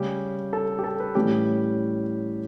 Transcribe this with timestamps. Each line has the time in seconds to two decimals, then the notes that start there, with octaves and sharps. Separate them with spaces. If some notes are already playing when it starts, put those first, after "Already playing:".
Already playing: C#3 G3 C#4 G4
0.53 A4
0.79 G4
0.84 A4
1.00 B4
1.15 A2 E3 G3 C#4 G4